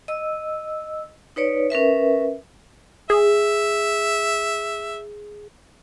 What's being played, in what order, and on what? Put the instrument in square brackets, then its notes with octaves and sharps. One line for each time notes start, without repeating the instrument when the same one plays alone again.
[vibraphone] D#5 E6
D#4 B4 C#5 D5
C#4 A#4 B4 E5
[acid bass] G#4 [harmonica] E5